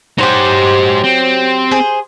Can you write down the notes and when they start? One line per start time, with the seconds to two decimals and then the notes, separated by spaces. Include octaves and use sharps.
0.18 F#3 D#4 G4 C5
1.04 C4
1.71 G#4 C5